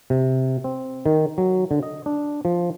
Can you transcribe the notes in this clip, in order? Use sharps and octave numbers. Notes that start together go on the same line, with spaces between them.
C3
C4
D#3
F#3
D3
D#5
D4
F3